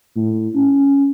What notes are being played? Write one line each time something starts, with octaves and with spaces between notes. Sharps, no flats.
A2
C#4